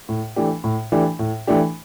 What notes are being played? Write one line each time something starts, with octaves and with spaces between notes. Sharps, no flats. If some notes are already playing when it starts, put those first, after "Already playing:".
A2
E3 A3 D4 G4
A2
E3 A3 D4 G4
A2
E3 A3 D4 G4